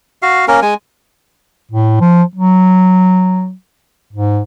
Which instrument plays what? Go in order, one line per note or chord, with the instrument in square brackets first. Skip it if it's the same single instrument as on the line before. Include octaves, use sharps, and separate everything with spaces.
[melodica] F#4 F5
A#3 C#4 A#4
G#3 G#5
[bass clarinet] A2
F3
F#3
G#2